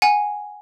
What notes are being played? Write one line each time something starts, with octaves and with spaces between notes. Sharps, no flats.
F#5 G#5